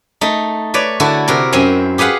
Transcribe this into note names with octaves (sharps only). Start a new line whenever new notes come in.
A3 D#4
B4 C#5 D5
D3 E4 F#4 A4
C3 F#4 A#4
F#2 C4 C5 G#5 A#5
G4 G#4 B4 F5 F#5